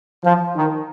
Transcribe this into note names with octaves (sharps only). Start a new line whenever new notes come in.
F3
D#3